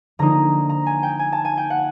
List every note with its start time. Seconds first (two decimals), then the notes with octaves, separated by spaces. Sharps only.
0.19 D3 F3 A#3 D#4 A#5
0.69 A#5
0.86 G#5
1.03 G5
1.19 G#5
1.32 A5
1.45 G#5
1.57 G5
1.70 F#5